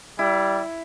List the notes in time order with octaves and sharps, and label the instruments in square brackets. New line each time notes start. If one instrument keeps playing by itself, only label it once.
[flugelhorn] G3 [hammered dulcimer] E4